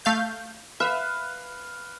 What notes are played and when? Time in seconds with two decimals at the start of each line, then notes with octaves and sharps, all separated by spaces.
0.05 A3 F5 G6
0.80 B4 E5 F5